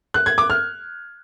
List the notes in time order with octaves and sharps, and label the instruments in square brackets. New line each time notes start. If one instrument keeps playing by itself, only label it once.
[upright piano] F#6
G#6
D6
F6